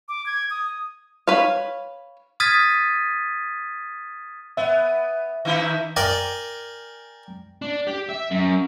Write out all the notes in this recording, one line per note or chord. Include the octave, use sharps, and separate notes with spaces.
D6
G#6
D#6
B4 C#5 F5
D#6 F6 G#6 A6 B6 D#7
B3 E5
D#3 D#4 E4
A#4 D5 G5 G#5
D4
G4
E5
F#2